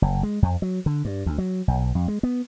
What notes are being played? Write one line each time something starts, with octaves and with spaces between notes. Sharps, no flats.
F#1
G#3
F2
F#3
D3
G2
D2
F#3
B1
F2
G#3
B3